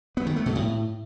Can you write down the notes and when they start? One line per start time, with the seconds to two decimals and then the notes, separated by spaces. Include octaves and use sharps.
0.17 B3
0.27 D#3
0.36 A3
0.46 B2
0.55 A2